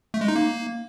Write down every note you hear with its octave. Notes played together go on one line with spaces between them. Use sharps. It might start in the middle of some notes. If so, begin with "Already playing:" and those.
A3
G#3
D#4
A#3